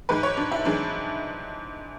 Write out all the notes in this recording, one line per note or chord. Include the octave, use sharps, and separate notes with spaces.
G#2 E3 G#3 B4
C#5
D4
E4
G#2 E3 G#3 D4